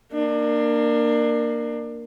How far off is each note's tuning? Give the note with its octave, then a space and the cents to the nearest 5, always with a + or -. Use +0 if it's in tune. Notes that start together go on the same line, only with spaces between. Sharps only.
A#3 +0 D4 +25